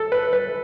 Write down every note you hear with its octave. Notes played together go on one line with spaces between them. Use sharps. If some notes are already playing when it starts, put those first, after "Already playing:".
Already playing: A4
B4
B4